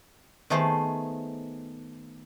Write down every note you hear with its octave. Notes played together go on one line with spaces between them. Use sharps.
D#3 A3 B3 G#4 C5